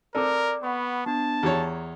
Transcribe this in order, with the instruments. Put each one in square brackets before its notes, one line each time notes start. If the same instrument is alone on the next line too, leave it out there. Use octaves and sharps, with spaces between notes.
[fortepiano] C4 A4 [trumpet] A#4 [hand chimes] D5 D6
[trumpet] B3 [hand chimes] F#5 B5 C#6
[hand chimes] B3 D4 [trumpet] A5
[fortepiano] E2 G4 C#5 [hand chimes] A#5